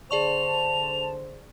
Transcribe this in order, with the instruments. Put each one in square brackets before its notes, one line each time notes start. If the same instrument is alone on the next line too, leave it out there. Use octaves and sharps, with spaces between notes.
[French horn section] D3 C5 [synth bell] G#4 D5 C#6 [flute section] A5 [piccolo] F7